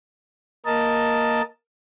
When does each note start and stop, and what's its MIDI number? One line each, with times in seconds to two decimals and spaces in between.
0.66 1.42 58
0.66 1.42 70
0.66 1.42 75
0.66 1.42 81